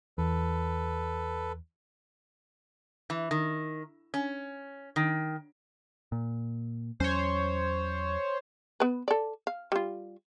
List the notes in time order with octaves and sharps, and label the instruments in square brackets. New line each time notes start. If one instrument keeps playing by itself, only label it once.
[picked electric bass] E2 [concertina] A4 B4
[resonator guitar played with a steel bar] E3
D#3
C#4
D#3
[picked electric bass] A#2
[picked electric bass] E2 F#3 C#4 [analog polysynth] C5 C#5
[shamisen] B3 B4
A4 D5
F5
G3 F4